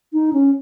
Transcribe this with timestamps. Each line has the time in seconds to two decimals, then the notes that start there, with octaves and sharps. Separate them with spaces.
0.13 D#4
0.33 C#4